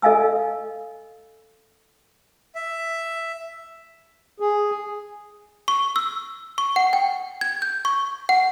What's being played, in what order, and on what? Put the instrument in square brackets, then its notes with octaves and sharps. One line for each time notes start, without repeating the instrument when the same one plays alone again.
[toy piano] A4 D#5 F5 G#5 E6
[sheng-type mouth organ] E5
[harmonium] G#4
[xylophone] C#6
E6
C#6
F#5
G5
G#6
G6
C#6
F#5